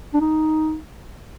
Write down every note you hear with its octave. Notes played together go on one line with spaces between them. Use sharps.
D4
D#4